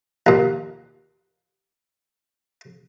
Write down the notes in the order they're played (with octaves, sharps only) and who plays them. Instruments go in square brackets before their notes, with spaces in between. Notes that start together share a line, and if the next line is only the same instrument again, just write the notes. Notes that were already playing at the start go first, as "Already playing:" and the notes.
[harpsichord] D#2 A#2